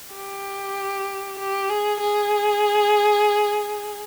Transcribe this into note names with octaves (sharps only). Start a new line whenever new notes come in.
G4
G4
G#4
G#4